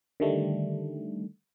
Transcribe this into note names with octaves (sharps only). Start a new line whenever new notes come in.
D3 D#3 G3 A3